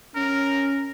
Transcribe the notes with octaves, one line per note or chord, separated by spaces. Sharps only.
C#4 A#4